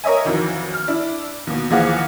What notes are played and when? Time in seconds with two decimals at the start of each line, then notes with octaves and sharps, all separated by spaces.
0.04 A#4 C#5 D#5 E5 G#5
0.25 F2 D#3 E3 F#3
0.74 F6
0.88 D4 E4
1.47 D#2 B2
1.70 D#2 E3 F3 G#4 F5 F#5